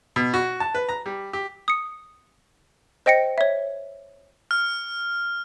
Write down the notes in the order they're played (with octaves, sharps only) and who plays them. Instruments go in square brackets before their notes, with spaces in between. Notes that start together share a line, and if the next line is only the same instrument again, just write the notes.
[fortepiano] B2
F#4
A5
B4
A#5
G3
G4
[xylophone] D#6 C#7
C5 D#5 G5 A#6 C#7
C#5 E5
[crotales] F6